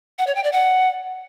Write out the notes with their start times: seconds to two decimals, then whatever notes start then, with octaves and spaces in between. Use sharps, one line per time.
0.19 F#5
0.27 C#5
0.35 G5
0.44 D5
0.52 F#5